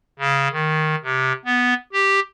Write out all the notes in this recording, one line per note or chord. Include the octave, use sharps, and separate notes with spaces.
C#3
D#3
C3
B3
G4